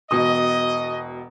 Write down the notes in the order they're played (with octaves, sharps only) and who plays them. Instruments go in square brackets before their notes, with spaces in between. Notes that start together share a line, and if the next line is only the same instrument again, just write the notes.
[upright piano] E1 B2 D#6 [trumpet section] D#5